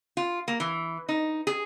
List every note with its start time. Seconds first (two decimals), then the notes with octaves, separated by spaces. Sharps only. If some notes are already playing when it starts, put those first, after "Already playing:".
0.17 F4
0.48 A#3
0.60 E3
1.09 D#4
1.47 G#4